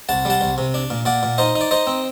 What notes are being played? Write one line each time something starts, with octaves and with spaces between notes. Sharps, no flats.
C2 F#5 A5
G3 F#5 A5
C2
C3
D4
A#2
A#2 D5 F#5
A#2
D#4 C5 D#5
D#4
D5
D#4 C5 D#5
C4